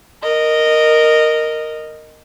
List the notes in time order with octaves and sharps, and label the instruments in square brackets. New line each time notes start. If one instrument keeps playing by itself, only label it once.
[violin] A#4 D#5